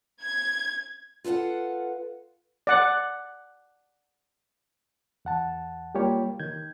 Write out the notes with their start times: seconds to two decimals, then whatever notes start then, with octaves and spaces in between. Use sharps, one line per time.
0.22 G#6
1.24 F4 A4 B4 F5 F#5
2.67 D5 F#5
5.25 E2 F#5 A5
5.95 G3 A#3 F4 G4 C#5
6.40 D#3 G6 G#6